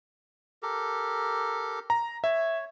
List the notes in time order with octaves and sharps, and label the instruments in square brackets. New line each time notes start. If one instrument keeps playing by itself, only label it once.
[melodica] G4 A4 A#4
[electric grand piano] A#5
[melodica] C#5 [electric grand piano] E5